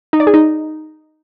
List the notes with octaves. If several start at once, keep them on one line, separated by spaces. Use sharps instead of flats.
D#4
D5
G#4
D#4